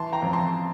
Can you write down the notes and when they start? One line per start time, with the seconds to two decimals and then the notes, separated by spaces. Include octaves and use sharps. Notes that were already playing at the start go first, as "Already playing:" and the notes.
Already playing: E3 A5 C6
0.12 G5 A#5
0.22 F2
0.33 A5 C6